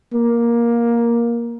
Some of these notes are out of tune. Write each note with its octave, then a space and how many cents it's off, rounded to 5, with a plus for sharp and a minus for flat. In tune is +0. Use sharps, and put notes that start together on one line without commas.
A#3 +10